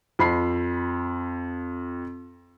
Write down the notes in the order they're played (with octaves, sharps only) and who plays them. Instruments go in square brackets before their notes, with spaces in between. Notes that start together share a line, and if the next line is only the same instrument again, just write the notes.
[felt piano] F2 B5 C7